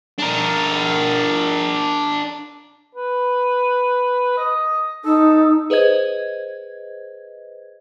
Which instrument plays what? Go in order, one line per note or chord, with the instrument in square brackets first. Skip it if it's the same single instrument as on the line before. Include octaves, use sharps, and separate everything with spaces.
[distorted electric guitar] D4 A#4
[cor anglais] B4
D#5
[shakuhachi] D#4 [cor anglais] A4
[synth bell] G#4 B4 C5 D#5 G#6